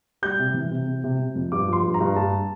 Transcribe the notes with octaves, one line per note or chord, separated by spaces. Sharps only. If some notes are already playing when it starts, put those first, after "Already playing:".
G3 G6
C3
E3
C3
C3
C3
C3
F2
G2 D6
F3 C6
G2
A#5
G2
G2 A5